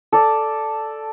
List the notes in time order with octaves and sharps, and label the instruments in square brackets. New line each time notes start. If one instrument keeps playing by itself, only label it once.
[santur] A4 D5